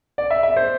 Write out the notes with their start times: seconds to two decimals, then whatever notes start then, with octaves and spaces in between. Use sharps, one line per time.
0.18 D5
0.31 E5
0.43 E5
0.57 C5